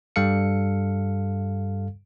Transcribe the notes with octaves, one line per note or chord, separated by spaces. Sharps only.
G2 G3 A4 F5 C#7